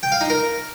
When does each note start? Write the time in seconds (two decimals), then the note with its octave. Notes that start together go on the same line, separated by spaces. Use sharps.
0.03 G5
0.12 F5
0.21 D#4
0.30 A#4